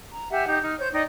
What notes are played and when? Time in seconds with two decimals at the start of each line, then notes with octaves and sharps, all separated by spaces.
0.11 A#5
0.30 G4 E5 F#5 G#5
0.47 D#4 G4
0.63 D#4 F6
0.79 C5 C#5 G6
0.92 D#4 D5 D#5 G5